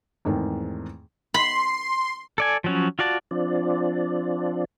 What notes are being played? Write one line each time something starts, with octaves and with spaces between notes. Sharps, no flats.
E2 G#2 D#3 A3 C4
B5 C6
A4 D5 G#5
F3 F#3 C#4
F4 F#4 D5 A5
F3 C4 D4 F4 D5